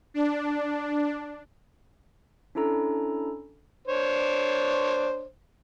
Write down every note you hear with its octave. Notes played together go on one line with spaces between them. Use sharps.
D4
C#4 D4 E4 A4 A#5
D4 C5 C#5